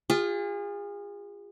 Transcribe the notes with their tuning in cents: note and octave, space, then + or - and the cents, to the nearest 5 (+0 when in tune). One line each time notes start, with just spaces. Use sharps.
F4 +10 G#4 -35